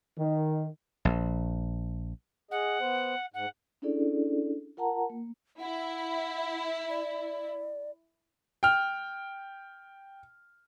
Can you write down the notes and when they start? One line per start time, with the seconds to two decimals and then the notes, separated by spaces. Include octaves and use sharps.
0.18 D#3
1.05 A#1
2.51 G#4 D#5 F#5
2.80 B3 C5
3.34 G#2 F#5
3.82 C#4 D4 E4 G#4 A4 D5
4.77 F4 A#4 F#5 A5 A#5
5.10 A#3
5.60 E4 F#5
6.90 D5
8.63 G5 F6